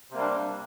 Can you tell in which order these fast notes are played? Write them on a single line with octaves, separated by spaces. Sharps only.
C3 A#3 G3 D4